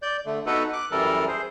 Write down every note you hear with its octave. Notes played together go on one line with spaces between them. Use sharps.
D5 G6
D3 A3
B3 D#4 F#4 A4 B4
D6 F#6
F#2 E3 G3 A4 A#4
G#4 C5